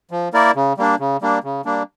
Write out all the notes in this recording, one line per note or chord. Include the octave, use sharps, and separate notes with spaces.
F3
A#3 E4 A#4 D5
C#3
G3 A#3 D4
C#3
G3 A#3 D4
C#3
G3 A#3 D4